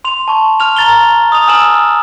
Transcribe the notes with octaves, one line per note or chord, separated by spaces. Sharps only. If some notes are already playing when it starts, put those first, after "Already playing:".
C6 F7
A5 C#6
F6 F7
A#5 A6 F7 G7
D#6 F7
G#5 E6 F6 E7 F#7